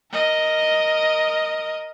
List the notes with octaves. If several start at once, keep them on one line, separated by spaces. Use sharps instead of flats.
A#4 D#5